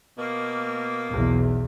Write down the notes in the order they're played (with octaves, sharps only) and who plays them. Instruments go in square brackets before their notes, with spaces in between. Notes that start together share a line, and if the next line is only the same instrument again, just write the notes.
[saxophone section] B2 A#3
[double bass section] B1 E2